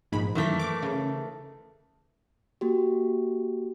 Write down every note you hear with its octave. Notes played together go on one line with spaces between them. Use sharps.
A#1 G#2 B5
F#2 D#3 E3 A3 B6
D6
C#3
A#3 F#4 G4